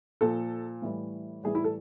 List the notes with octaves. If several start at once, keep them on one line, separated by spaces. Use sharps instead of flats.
A#2 F3 A4
A2 E3 G3
A2 E3 G3 G#4
E4
A4